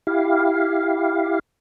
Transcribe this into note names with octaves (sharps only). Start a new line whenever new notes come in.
E4 G4 F5